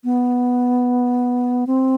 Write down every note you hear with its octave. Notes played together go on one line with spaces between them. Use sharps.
B3
C4